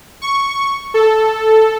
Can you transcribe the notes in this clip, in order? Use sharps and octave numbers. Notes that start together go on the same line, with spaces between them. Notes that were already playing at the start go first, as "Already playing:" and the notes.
C#6
A4